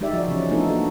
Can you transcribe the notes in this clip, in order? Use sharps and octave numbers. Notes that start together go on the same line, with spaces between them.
G#3 D#4 G4 D5 E5
F3 F#4
C#3 E3 F3 G#3 C#4
A3 B3 D4 D#4 F4 A4
A#3 F#4